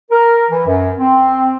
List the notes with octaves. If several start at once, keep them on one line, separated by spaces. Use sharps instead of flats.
A#4
E3
F#2
C4